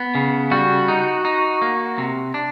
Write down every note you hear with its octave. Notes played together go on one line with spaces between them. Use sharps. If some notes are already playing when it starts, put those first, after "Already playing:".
Already playing: B3
C#3
G3 F#4
D#4
D#4
A#3
C3
D4